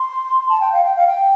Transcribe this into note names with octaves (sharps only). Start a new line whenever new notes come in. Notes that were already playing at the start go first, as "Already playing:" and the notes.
Already playing: C6
A5
G5
F5
G5
F5
G5